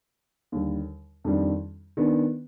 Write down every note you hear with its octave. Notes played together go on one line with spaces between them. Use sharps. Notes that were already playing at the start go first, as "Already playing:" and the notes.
D#2 D3 G3
F2 D#3 G3 D4
D#3 B3 D4